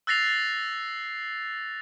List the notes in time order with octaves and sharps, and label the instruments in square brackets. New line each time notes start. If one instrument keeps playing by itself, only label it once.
[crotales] E6 F#6 A6 A#6 C7 F7